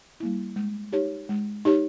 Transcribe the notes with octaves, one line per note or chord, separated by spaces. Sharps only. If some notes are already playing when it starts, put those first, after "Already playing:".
G3 A#3 E4
G#3
D#4 G4 C#5
G#3
D#4 G4 C#5